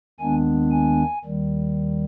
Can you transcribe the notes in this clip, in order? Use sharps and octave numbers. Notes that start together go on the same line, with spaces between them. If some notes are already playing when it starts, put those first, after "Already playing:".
D#2 D#3 G#3 B3 D4 G#5
G#5
D#2 D#3 G3